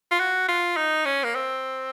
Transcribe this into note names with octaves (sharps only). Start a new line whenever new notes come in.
F4
F#4
F4
D#4
C#4
A#3
C4